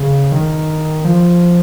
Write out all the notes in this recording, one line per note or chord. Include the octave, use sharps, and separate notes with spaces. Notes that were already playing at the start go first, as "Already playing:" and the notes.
Already playing: C#3
D#3
F3